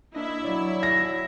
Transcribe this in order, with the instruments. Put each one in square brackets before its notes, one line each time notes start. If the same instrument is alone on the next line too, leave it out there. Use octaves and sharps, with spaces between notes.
[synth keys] A#3 D4 D#5 [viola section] E4 E5
[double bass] F#3 [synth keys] C#5 D5 B5
[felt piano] A#6